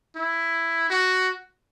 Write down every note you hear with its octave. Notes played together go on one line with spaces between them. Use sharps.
E4
F#4